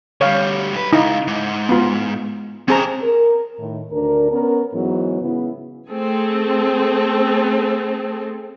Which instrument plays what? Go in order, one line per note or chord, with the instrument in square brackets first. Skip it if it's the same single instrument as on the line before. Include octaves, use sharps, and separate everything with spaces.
[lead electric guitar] D2 G3 [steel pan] C#5 F5
[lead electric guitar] B1 B4
[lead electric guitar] C#2 [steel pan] D#4 E4
[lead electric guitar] G#2
[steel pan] B3 F4
[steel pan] C4 G#4 A#5 [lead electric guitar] C#4 A5
[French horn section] A#4
A2 D#3
D2 D4 A#4
B3 C#4 A#4
G#2 E3 F#3 G#3 B3
C#3 B3 E4
[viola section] A3 C4 G#4 A4